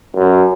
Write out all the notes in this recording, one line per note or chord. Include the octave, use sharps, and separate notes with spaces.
F#2